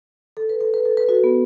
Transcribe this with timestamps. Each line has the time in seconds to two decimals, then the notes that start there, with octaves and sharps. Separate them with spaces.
0.37 A4
0.49 B4
0.61 A4
0.74 B4
0.85 A4
0.97 B4
1.09 F#4 A4
1.24 B3